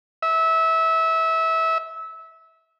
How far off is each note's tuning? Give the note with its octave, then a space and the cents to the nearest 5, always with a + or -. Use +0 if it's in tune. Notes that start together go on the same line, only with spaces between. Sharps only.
E5 -20